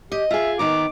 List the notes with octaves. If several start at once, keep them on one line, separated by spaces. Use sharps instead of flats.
G4 D#5
F4 G#4 E5
D#3 B3 A#5 D6